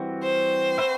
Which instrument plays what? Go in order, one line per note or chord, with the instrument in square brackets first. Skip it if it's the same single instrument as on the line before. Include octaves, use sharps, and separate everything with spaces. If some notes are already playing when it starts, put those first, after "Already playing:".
Already playing: [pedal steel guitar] E3 G3 C4 F#4
[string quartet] C5
[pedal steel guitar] C4 F#4 B4 E5